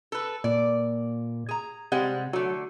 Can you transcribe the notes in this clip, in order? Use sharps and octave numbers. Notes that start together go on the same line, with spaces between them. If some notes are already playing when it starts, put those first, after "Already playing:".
A4 B4
A#2 D5
G#4 A#5
C3 G3 G#3 F#5
D3 F#3 A3